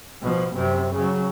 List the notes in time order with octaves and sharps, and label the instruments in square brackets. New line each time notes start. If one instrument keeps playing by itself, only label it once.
[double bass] B2 F3
F#2 C3
C#3 F#3